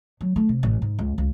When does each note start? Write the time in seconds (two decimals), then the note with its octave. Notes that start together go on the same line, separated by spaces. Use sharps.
0.21 F#3
0.36 A3
0.49 C3
0.63 A1
0.82 G#2
0.99 C#2
1.18 C#2